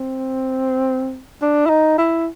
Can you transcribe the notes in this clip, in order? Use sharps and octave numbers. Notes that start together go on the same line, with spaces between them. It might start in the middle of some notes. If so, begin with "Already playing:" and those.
Already playing: C4
D4
E4
D#4
E4